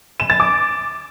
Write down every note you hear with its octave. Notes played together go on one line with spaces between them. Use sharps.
E7
A6
D6